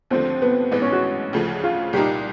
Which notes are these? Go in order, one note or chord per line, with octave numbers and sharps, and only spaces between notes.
D#2 D3 F3 A3 C4
B3
A1 G#2 E3 B3
C#4
F#4
D2 C#3 F3 A3
F4
C2 A#2 G3 A#3 D#4 G4